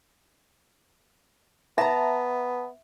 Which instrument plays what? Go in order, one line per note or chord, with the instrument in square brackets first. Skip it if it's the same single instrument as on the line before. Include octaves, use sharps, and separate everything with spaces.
[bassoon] B3 [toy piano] E5 [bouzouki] A5 A#5